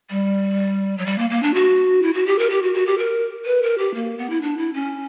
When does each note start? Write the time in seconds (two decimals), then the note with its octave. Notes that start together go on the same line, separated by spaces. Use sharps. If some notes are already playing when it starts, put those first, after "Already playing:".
0.10 G3
0.98 F#3
1.06 G3
1.18 A#3
1.30 A#3
1.43 D4
1.54 F#4
2.03 E4
2.14 F#4
2.26 G4
2.39 A#4
2.50 G4
2.62 F#4
2.74 F#4
2.86 G4
2.98 A#4
3.45 B4
3.62 A#4
3.78 G4
3.94 A#3
4.18 B3
4.30 E4
4.42 D4
4.58 E4
4.74 C#4